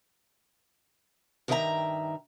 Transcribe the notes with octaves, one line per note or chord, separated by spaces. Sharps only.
G2 D#3 D#4 E4 E5 A#5